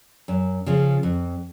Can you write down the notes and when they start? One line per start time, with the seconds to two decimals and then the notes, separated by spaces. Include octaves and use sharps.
0.28 F#2
0.66 C#3 F3
1.03 F2